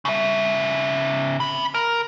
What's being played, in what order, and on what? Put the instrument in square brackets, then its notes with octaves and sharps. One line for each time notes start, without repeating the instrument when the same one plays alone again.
[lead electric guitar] C#3 E5
C4 B5
A#4